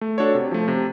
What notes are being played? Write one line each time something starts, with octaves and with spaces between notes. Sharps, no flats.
A3
D4 F#4 A4 C#5
C3
F3 A3
C3